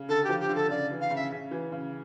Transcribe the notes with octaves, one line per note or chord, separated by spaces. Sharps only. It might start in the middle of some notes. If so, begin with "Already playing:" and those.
Already playing: C#3
D3 A4
F3 G4
G4
D3
A4
C#3 D5
E3
F5
C#3
E5
C#3
E3
C#3